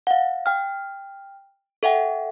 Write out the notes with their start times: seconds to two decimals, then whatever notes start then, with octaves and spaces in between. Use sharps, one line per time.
0.07 F5 F#5
0.46 G5 F6
1.83 A4 E5 F#5 G5